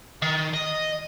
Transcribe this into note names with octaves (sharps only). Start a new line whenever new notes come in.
D#3
D#5